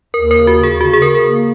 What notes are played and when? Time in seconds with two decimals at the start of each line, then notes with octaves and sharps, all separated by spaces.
0.14 D#2 A#4
0.31 A#4
0.36 C#3
0.47 F#4
0.59 C#3 G#4
0.80 C#3 F#4
0.93 G#4
1.02 C#3 A#4
1.24 A#3